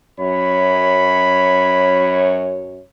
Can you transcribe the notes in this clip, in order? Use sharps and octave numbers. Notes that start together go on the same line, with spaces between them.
F#2 C#5 B5